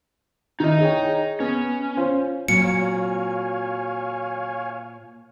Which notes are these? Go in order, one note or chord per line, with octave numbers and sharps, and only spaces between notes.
D#3 D#4 E4 D#5
G#4 C#5 G5
B3 C#4
F4 C5 C#5
A#2 F#3 C4 C#5 F5 G#5 C#7